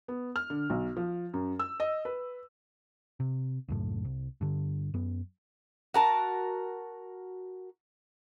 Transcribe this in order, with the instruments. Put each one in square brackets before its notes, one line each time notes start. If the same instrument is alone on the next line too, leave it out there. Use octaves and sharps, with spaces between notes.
[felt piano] B3
F6
D3
B1
F3
F#2
E6
D#5
B4
[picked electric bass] C3
C#2 F#2 A2
C2
G2 D3
F#2 B3
[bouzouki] F#4 A#4 A5